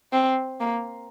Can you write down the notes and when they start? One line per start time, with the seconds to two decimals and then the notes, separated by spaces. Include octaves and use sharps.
0.13 C4
0.60 A#3